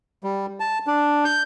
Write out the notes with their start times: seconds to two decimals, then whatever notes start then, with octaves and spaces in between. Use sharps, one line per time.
0.24 G3
0.60 A5
0.87 D4
1.25 G6